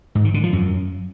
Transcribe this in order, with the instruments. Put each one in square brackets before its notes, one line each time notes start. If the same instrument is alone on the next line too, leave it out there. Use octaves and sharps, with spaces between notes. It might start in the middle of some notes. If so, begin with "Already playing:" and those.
[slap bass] G#2
D#3
D3
F3
F#2